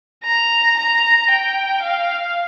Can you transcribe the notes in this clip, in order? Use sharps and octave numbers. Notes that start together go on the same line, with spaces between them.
A#5
A#5
G5
F5